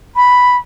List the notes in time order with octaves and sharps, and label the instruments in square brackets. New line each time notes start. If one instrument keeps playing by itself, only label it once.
[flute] B5